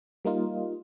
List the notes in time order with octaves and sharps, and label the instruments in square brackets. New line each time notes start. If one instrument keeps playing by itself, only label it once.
[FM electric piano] G3 A#3 D#4 F4